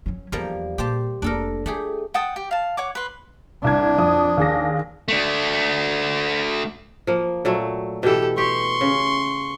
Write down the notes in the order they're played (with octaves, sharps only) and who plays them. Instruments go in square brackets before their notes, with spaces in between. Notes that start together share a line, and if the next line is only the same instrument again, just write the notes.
[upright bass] F#3 C#4
[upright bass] E2 [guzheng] F3 G3 A#3
[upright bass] A#2 [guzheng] G4 C5 A5
[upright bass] F1 A#3 [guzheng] D4 A4 A#4
[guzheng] A3 G4 G#4 [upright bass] F4
[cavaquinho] F#5 G5 A5 D#6
G4
F5 A5
C#5 F#5 D6
B4 C6
[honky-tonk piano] C2 G#6 [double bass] D4
[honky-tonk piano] F2 D#6
D#2 G#4 A#6
[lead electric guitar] A3 D4
[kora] F3 A#3
A#2 F#3 A3
[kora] B2 E3 [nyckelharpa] G4 A4
[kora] G4 [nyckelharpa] C6 C#6
[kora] C#3